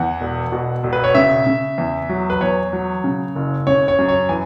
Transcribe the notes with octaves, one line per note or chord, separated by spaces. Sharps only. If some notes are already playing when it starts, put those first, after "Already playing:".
Already playing: E2 F#5
E1
B2
E1
B4
C#5
C#3 E5
C#3
E2
F#3
B4
E2 C#5
F#3
C#3
F#1
C#3 C#5
C#5
F#2
C#5
E3 G#5